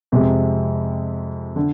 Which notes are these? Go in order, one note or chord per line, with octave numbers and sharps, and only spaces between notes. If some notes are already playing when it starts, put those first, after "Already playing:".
F2 C3 G#3
D3